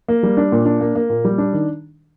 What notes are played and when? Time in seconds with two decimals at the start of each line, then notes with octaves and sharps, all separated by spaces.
0.08 A#3
0.23 G3
0.37 D4
0.52 A#2
0.66 D4
0.80 A#3
0.95 A#3
1.09 A#2
1.25 G3
1.38 D4
1.53 D#3